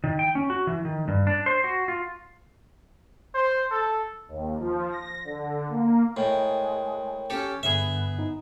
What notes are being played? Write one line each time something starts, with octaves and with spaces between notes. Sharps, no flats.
D#3
G5
C#4
F#4
E3
D#3
G2
D4
C5
F#4
F4
C5
A4
D#2
F3
A#6
D3
A#3
A2 G#3 A#4 G5
C#4 G4 A4
G2 D3 B3 G#4 E5
D#4